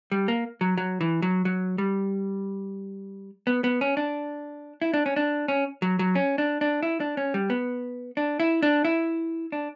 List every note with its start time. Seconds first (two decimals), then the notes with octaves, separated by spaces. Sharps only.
0.12 G3
0.28 A#3
0.61 F#3
0.78 F#3
1.01 E3
1.22 F#3
1.45 F#3
1.78 G3
3.47 B3
3.64 B3
3.81 C#4
3.97 D4
4.82 E4
4.94 D4
5.06 C#4
5.16 D4
5.48 C#4
5.82 F#3
5.99 F#3
6.15 C#4
6.38 D4
6.61 D4
6.83 E4
7.00 D4
7.17 C#4
7.34 G3
7.50 B3
8.17 D4
8.40 E4
8.63 D4
8.85 E4
9.52 D4